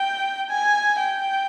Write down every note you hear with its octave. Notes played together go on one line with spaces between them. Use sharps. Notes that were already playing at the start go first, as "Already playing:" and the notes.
Already playing: G5
G#5
G5